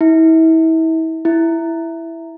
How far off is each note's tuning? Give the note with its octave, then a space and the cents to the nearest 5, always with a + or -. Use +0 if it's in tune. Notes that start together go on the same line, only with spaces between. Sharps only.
E4 -35
E4 +5